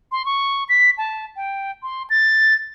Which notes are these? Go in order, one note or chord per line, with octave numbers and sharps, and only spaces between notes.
C6
C#6
B6
A5
G5
C6
A6